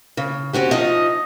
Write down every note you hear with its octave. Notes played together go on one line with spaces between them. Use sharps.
C#3
C4 C#4 F#4 G4
F3 D#4 D#5